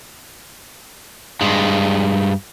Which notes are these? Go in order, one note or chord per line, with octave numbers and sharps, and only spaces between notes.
G2 G#3